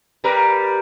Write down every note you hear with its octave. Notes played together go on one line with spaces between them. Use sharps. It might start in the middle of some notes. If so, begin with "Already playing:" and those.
G3 A#4 B4